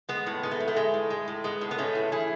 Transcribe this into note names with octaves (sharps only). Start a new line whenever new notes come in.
G#3 B3
A2
G#3 B3
A3
A2
A3
G#3
A2
G#3
A2
G#3 B3
A2
B3
G#3 A3 C#4
A2
E3 E4 G#4